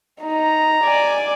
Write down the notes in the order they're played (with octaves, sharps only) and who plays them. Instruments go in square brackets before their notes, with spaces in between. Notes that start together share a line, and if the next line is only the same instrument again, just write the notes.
[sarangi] D#4 [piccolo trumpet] A#5
[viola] D5 [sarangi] G#5